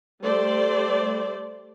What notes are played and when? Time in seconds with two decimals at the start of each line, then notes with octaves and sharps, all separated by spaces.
0.22 G3 A3 C5 D5